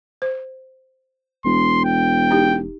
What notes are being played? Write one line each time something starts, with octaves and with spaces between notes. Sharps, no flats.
C5
E1 C6
G5
D#4 G4